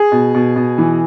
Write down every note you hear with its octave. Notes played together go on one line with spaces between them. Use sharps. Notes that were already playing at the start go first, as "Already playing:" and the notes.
Already playing: G#4
B2
B2
B2
E3